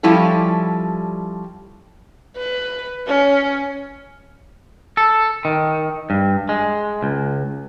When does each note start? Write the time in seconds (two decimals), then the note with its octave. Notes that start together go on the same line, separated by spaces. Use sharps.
0.03 F3 G3 C#4 E4 A4
2.37 B4
3.07 C#4
4.97 A4
5.45 D#3
6.10 G2
6.49 G#3
7.03 C#2